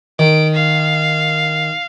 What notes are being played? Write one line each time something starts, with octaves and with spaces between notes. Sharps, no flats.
D#3 D7
F5